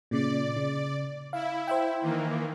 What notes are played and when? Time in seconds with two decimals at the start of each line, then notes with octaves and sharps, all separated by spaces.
0.11 A#2 C#3 D5
0.56 C#3
1.33 E4 F5
1.68 C5 E5 G5
2.01 D#3 E3 A#3